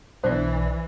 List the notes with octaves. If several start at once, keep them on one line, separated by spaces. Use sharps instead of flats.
B1 E3 D4 C5